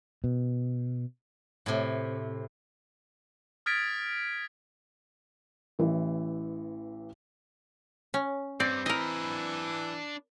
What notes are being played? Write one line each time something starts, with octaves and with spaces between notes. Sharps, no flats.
B2
A2 C3
D#6 F6 G#6 A6 B6 D7
A1 E3
C#4
G2 C4 D5
E3 D4 A#4 D#5 B5